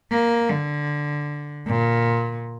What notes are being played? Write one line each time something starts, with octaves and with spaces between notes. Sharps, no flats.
A#3
D3
A#2